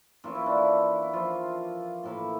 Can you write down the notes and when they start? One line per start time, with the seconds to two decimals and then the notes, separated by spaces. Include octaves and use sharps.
0.24 E3 A#3 C#4 F4
0.35 E4
0.46 D4
0.57 E4
1.02 E4
1.13 F3 F4
2.03 A2 E3 A#3